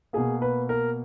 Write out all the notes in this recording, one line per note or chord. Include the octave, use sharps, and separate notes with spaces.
B2 A#3 G#4
B4
A#4